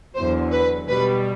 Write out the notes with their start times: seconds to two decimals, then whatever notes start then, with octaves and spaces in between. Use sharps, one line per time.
0.15 E2 D3 F#3 C5
0.51 B4
0.87 B2 G3 B4